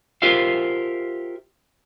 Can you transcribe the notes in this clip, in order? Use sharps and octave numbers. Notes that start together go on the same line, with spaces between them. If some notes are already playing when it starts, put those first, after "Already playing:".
F4 G4 A#4 C5 E5 F5